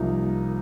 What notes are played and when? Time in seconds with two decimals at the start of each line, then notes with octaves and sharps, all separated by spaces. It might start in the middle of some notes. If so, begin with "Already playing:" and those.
Already playing: C2 C3 F3 A#3 D#4